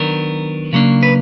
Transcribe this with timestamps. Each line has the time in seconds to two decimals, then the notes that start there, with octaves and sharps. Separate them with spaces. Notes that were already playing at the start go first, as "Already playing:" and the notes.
Already playing: D#3 F#3 B3 D4 A#4
0.73 C#3 F#3 A#3 D4
1.03 B4